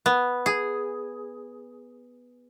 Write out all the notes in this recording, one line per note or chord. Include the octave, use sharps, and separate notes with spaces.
B3
G#4